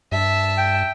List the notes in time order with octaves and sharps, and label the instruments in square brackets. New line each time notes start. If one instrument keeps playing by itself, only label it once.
[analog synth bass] G2 [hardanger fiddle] E5 A5
[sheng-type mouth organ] G5